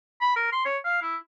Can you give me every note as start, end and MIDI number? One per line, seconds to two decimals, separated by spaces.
0.21 0.35 83
0.36 0.52 70
0.52 0.63 84
0.65 0.77 73
0.85 1.00 77
1.02 1.16 64